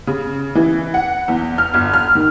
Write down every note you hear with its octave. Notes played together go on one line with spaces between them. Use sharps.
C#3
E3
F#5
E2
F6
G1
F6
D#3